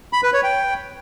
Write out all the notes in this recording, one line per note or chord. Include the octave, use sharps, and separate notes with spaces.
B5
B4
C#5
G5